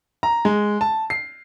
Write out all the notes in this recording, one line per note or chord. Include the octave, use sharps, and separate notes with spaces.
A#5
G#3
A5
C7